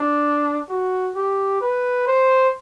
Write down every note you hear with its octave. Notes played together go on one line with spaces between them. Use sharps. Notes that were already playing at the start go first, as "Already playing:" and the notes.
Already playing: D4
F#4
G4
B4
C5